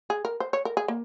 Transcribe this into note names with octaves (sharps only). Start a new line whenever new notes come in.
G#4
A#4
C5
C#5
A#4
G#4
A#3